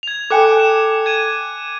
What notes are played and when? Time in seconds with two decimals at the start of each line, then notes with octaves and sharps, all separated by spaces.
0.03 G#6 F7
0.30 A4 G5 G#5 D6 F#6 C#7
0.60 E7
1.06 G#6 D#7